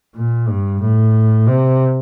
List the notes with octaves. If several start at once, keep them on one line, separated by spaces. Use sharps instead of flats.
A#2
G2
A2
C3